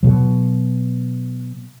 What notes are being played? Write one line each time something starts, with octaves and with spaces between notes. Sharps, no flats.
B2 F#3